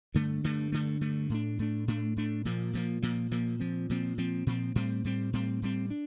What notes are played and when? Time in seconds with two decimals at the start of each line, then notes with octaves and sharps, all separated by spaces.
0.15 G2 D3 A3
0.44 G2 D3 A3
0.72 G2 D3 A3
1.01 G2 D3 A3
1.30 A2 A3 D4
1.59 A2 A3 D4
1.88 A2 A3 D4
2.16 A2 A3 D4
2.45 A#2 F3 A#3
2.73 A#2 F3 A#3
3.02 A#2 F3 A#3
3.31 A#2 F3 A#3
3.60 A#2 F3 C4
3.89 A#2 F3 C4
4.18 A#2 F3 C4
4.47 A#2 F3 C4
4.75 A2 G3 C4
5.04 A2 G3 C4
5.33 A2 G3 C4
5.62 A2 G3 C4
5.90 D4